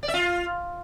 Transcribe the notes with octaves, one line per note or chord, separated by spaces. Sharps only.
D5
E5
F4